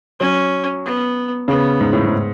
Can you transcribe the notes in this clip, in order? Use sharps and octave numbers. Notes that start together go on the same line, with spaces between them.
F#3 C#4
B3
C#3 B3
G#2
A2
G#2